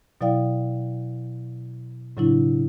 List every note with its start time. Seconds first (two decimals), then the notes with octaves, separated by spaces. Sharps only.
0.21 B2 F#3 E4 D5 F5 G5
2.17 A2 C#3 F#3 D4 E4